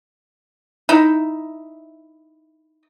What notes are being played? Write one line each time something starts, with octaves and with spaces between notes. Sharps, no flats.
D#4 E4